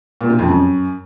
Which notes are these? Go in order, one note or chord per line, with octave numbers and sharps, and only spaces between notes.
A#2
C3
F2
F#2